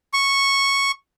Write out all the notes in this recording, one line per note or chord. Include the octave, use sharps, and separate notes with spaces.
C#6